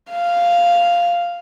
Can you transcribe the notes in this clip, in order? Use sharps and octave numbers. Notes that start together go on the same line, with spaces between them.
F5